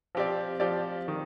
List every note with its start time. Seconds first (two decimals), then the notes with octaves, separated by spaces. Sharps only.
0.15 F3 C4 G4 D5
0.60 F3 C4 G4 D5
1.08 D#3